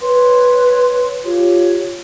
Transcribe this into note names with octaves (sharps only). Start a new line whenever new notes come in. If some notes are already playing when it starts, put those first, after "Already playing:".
B4 C#5 C6
F4 G4 C#5